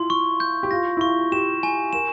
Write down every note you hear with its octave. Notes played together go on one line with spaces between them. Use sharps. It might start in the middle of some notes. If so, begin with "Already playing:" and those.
Already playing: E4 F4 C6
C#6
G6
G4
F4 A#6
E4
F4 C#6
G4 E7
G#5
A#4 E7